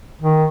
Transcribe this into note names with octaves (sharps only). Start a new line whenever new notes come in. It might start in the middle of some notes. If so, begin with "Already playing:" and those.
D#3